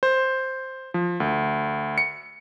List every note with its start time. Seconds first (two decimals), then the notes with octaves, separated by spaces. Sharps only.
0.03 C5
0.94 F3
1.20 D2
1.98 C#7